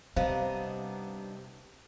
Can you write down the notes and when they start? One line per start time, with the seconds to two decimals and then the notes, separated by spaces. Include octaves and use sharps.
0.16 C3 G3 B3 D4 D#4 C5 F5